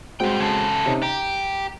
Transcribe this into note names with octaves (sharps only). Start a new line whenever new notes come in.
G2 G#3 C4 F#4 G5
C#3 A4
C3 C#4 D#4
G4 A#5